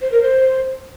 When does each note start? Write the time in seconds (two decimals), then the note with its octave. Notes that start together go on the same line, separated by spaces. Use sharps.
0.01 C5
0.11 A#4
0.21 C5